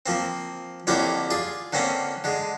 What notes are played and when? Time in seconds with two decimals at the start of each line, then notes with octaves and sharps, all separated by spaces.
0.06 F3 A#3 C4
0.87 F2 D3 A#3 E4 G4 C#5
1.30 F4 G#4 D5
1.73 D3 A#3 C4 C#4
2.24 D3 G#3